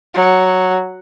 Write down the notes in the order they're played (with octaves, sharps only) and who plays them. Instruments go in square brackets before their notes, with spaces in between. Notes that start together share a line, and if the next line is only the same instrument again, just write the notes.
[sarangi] F#3